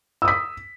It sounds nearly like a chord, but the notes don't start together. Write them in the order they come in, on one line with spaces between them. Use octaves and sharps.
E6 D#6 B6